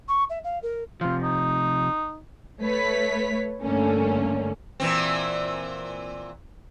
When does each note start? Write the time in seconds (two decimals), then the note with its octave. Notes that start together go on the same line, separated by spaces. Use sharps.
0.08 C#6
0.30 E5
0.44 F5
0.63 A#4
1.01 C3 F3 F4
1.23 D#4
2.61 A3 B4 C#5 B6
3.63 G2 D3 A3 A#3 C#4
4.80 A#2 E3 C4